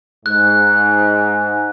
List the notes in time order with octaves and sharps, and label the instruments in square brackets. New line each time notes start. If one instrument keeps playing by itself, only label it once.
[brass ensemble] G#2 [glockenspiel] F#6